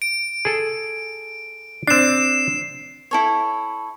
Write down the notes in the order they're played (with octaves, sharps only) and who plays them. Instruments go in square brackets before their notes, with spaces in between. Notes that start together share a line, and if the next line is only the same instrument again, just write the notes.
[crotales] D7
[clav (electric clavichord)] G#4 A4
[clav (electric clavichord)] C4 D4 [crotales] C7 E7
[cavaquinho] E4 A4 C#5